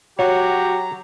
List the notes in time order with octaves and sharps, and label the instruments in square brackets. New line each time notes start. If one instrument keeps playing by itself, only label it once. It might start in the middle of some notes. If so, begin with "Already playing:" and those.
[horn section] F#3 A#5 [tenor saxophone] F#4 [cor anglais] G4 [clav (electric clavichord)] C#5